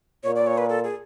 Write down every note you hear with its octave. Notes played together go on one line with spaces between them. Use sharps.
A#2 C#5
D5
C#5
B4
A4
G#4